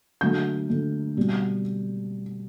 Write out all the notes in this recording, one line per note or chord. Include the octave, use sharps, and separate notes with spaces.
D3 F#3 A3 G6
D3 F#3 A3
B2 G3 C4